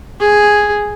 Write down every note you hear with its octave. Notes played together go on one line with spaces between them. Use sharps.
G#4